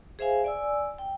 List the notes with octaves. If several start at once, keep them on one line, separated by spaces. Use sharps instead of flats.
G#4 C5 E5 F5 G#5
D5 G#5 E6
G5